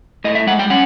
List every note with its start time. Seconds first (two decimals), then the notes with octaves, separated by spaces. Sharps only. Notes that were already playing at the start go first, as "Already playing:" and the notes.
0.24 A2 D#5
0.35 E5
0.47 G#3 F#5
0.59 G5
0.70 C#4 F#5